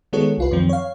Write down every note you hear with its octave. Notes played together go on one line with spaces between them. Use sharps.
D#3 G#3 B3 F#4 A4 C#5
C2 F4 B4
F#2 D#3 F3 C4
C#5 F5